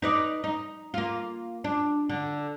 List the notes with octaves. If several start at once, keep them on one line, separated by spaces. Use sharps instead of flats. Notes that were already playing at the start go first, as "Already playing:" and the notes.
D#4 B4 D5
D#4
A#3 F4
D4
D3